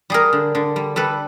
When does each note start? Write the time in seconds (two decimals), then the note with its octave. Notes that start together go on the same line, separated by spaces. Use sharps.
0.10 G3 G#4 A#4
0.33 D3
0.55 D3
0.76 G3
0.96 G3 A4 B4